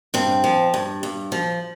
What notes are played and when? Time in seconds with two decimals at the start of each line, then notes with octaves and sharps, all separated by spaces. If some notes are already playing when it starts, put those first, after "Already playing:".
0.14 G2 C4
0.44 F3
0.74 G2
1.03 G2
1.32 F3